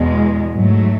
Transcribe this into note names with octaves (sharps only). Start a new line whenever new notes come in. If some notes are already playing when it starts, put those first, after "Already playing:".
Already playing: E2 B2 G#3
G#2 F#3 A3